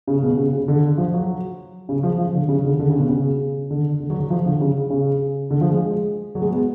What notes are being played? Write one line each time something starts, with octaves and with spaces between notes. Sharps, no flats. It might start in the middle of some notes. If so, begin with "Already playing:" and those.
C#3
B2
C#3
C#3
D3
F3
F#3
C#3
F3
F3
D3
C#3
D3
D3
C#3
B2
C#3
D3
D3
F#3
F#3
F3
D3
C#3
C#3
D3
F3
G#3
F#3
G#3
B3